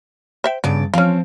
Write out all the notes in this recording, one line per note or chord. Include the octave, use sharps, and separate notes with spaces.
C5 E5 G5
G2 C#3 B3 D5
F3 C4 C#4 F4